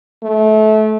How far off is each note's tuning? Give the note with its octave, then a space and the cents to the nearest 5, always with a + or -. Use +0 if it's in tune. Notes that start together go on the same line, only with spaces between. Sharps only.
A3 -25